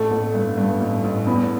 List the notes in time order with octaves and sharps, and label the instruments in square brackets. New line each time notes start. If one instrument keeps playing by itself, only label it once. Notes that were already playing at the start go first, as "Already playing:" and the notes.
Already playing: [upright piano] A1 [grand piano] A3
[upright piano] A1
G2
G2
A1
A1
[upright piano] E2 [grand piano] B3